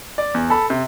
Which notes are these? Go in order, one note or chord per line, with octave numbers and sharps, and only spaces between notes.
D5
E2
A4 B5
C3